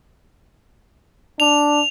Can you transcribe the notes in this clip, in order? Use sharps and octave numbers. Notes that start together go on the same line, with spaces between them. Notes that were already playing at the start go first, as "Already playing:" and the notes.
D4 F7